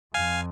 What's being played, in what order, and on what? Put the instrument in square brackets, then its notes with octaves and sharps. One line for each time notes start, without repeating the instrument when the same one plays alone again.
[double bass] F2 [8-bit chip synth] F5 G#5